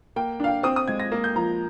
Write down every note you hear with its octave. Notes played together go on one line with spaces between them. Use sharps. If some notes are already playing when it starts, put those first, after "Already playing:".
A#3 G5
D4 F5
G5
C4 D#6
D#6
G#3 G#6
A#6
A#3
G6
F3 A#5